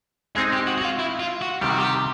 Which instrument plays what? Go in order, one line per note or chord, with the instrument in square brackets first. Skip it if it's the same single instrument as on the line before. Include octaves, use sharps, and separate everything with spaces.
[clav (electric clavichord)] G#3 C4 D#4 [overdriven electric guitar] G#4
[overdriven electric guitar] G4
F#4
F#4
F4
E4
F4
F#4
[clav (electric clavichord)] C3 D#3 G3 [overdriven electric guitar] G4
[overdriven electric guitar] F#4
G4